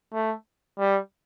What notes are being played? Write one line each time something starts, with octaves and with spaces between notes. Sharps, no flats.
A3
G3